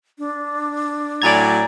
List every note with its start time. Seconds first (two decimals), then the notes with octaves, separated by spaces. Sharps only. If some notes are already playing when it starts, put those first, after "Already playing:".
0.18 D4
1.22 A2 F#3 D5 G#5 A#5 G#6 A6